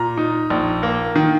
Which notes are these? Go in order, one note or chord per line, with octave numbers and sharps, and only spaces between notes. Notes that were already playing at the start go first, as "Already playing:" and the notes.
Already playing: A#2 A#5
D#4
A#1
A#3
D#3